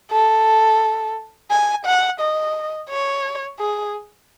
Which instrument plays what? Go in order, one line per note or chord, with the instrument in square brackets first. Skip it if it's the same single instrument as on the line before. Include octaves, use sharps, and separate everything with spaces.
[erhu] A4
G#5
F#5
D#5
C#5
G#4